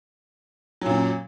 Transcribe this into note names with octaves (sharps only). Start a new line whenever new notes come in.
F#2 A#2 F#3